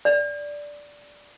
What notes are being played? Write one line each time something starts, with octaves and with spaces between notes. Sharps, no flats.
D5